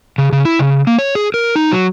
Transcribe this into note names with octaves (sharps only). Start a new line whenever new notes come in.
C#3
C#3
E4
C#3
A#3
C#5
G#4
A#4
D#4
F#3